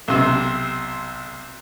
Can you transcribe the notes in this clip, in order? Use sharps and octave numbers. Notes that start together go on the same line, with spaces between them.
B1 C3